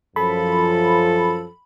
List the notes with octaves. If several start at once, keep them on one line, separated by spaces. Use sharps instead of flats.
F#2 F3 A4 B5